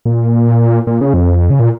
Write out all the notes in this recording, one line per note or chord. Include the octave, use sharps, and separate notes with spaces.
A#2
A#2
C#3
F2
C#3
A#2